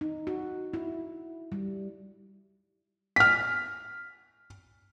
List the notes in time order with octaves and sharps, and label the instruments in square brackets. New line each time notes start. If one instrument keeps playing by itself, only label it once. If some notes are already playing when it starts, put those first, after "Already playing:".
[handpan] D#4
F#4
E4
G3
[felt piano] F6 B6